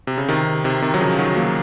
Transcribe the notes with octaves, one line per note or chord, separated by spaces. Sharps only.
C3
C#3
C3 D#3
C3 D#3
C3 D#3
F#3
C#3 F3
D#3 F#3
F#3 A#3